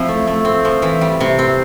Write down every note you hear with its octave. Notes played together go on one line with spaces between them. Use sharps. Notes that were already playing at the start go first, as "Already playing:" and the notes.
Already playing: F3 C4 E4
A3
A3
C4
F3
E3
G3
C3
C4